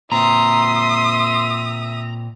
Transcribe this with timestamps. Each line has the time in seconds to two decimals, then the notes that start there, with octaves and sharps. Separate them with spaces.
0.12 A#2 C4 E5 A#5 C6 D#6